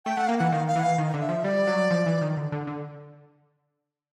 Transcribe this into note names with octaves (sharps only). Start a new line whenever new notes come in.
A3 G5
A3 F#5
A#3 F5
E3 F#5
D#3 F5
F5
E3 F#5
F5
D#3
D3
E5
F3
G3 D5
F#3
F3
E3
D#3
D3
D3
D3